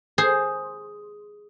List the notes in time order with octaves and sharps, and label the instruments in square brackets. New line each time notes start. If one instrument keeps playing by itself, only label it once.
[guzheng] G#4 C5